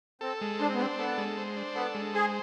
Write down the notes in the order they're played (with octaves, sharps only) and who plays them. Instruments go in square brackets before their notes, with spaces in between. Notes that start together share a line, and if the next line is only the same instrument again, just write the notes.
[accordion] C4 [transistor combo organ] A4
[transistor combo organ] G#3
[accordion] D4 [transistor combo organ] C5
[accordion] C4
B3
[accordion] C4 [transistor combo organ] D4
[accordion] B3 [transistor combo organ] A4
[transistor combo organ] G#3
C5
D4
[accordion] B3 [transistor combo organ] A4
[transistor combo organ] G#3
[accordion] G#4 [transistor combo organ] C5